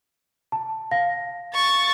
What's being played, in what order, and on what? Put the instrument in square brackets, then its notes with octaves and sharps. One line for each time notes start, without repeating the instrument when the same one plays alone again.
[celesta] A5
F5 A#6
[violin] C#6 A6